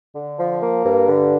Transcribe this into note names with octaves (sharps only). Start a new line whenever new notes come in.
D3
F3
A#3
G2
D3